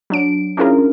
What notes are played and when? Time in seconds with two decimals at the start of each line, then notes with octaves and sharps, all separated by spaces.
0.10 F#3 D4 D7
0.57 C#4 D4 E4 F4 G#4 A#4